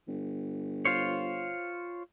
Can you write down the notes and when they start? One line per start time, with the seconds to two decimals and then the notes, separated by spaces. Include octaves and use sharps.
0.08 G1
0.85 F4 C5 C#5